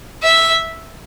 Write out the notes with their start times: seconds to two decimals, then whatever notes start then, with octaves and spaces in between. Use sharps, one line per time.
0.23 E5